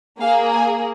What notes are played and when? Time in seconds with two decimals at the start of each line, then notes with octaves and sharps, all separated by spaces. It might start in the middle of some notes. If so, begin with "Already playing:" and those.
0.21 A#3 G#4 F5
0.53 G#5